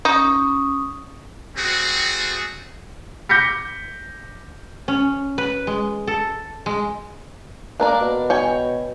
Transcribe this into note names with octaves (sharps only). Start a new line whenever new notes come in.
C#4 D#4 C#6 D#6
G3 A3 C4 F#4 G#4
D6 G6 A#6 B6 C#7
C#4
B4
G#3
A4
G#3
A#3 D4 A#4 D5
B2
C#5 G5 G#5